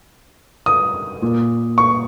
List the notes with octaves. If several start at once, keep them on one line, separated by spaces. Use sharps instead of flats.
D#6
A#2
C#6